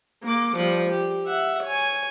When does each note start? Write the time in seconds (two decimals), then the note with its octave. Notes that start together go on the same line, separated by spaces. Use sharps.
0.23 A#3 D6
0.56 F3 G3
0.90 G4
1.26 E5 F#5
1.63 C#5 G#5